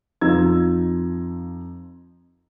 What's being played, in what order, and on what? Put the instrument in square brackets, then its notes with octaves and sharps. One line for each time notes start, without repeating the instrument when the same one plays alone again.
[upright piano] F2 F3 D#4 A#5 E6 G#6